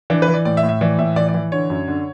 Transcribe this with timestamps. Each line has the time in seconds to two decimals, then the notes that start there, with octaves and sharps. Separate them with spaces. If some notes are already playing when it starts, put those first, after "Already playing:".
0.10 E3 D4
0.22 B4
0.28 E3
0.34 D5
0.45 A2 D5
0.57 E5
0.63 A2
0.69 E5
0.81 E3 D5
0.99 A2 E5
1.16 E3 D5
1.28 D5
1.34 E3
1.52 D3 C#5
1.70 F#2
1.88 D3